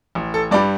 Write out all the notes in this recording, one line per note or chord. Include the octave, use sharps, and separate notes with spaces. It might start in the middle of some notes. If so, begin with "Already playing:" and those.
A1
A4
G2 G3 D5